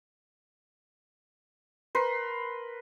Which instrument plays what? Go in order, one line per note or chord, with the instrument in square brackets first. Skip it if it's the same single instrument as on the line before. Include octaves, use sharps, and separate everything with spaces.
[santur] A#4 B4 C6